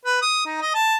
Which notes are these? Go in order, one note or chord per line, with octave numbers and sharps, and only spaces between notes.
B4
D#6
D#4
D#5
A5